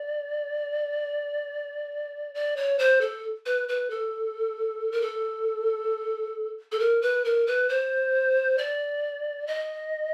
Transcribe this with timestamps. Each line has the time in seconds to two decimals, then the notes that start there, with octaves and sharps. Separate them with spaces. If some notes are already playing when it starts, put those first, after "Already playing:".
Already playing: D5
2.35 D5
2.57 C#5
2.79 C5
3.01 A4
3.46 B4
3.68 B4
3.90 A4
4.92 A#4
5.01 A4
6.72 A4
6.80 A#4
7.02 B4
7.25 A#4
7.47 B4
7.69 C5
8.58 D5
9.47 D#5